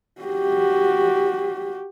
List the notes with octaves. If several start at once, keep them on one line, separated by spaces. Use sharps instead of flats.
F#4 G4